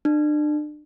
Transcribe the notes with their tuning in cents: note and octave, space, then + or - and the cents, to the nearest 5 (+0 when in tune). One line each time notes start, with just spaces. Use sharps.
D4 +35